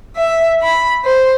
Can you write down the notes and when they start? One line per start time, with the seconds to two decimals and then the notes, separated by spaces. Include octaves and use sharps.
0.15 E5
0.62 B5
1.04 C5